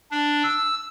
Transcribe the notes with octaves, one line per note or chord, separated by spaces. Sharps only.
D4
E6